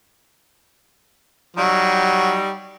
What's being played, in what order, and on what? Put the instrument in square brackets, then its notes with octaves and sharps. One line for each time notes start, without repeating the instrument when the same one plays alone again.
[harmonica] F#3 [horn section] G3 D#4